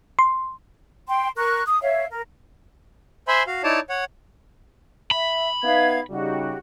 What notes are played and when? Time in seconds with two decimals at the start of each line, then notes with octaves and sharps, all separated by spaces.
0.19 C6
1.08 G5 C6
1.37 A#4 C#6 F#6
1.67 D#6
1.82 C#5 E5 F5
2.10 A#4
3.28 C5 E5 G#5 B5 C6
3.47 F#4 F5
3.64 D#4 E4 C#5 D5 A5
3.90 C#5 F#5
5.11 E5 B5
5.63 B3 D#4 E5 F5 G#6
6.10 C#3 G3 D#4 F#4 G4